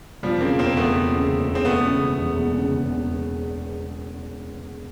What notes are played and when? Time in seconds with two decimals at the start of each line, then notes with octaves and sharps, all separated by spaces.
0.23 E1 F3 G3
0.41 C#3 A#3 C4
0.58 E1 A#3 C4
0.76 E2 A3 B3
0.94 E1
1.12 C#3
1.30 E1
1.48 E2
1.55 C4
1.65 E1 A3 B3
1.83 C#3
2.01 E1
2.18 E2
2.36 E1
2.55 C#3
2.72 E1
2.90 E2